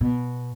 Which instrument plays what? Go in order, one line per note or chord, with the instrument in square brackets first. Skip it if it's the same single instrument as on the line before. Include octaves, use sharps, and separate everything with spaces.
[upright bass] B2